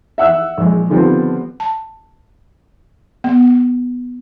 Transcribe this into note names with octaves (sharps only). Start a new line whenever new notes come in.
E5 F#5 E6 F#6
A#1 G#3
D3 D#3 F3 G3 B3 C4
A5
B3